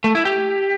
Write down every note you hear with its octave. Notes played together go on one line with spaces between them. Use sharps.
A3
E4
G4